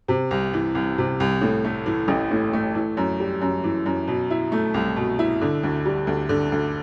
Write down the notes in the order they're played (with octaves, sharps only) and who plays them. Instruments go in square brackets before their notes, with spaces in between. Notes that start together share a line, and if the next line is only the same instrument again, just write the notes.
[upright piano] C3
C2
E3
C2
C3
C2
A2
A3
E3
A1
A2
A3
E3
F#2
G3
F#2
E3
F#2
B2
E4
A3
C2
B2
E4
D3
D2
G3
D2
D3
D2